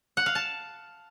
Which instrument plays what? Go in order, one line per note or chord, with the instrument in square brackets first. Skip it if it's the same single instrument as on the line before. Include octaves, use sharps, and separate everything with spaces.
[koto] F#5
F5
A5